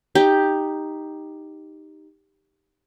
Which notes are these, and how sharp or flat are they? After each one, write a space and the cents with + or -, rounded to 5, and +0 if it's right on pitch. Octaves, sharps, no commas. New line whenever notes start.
D#4 +0 G4 +5